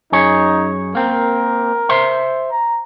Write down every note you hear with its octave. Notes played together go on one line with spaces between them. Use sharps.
F#2 D#4 G#4 C#5
A#3 C4 A#4
C5 E5 C6
A#5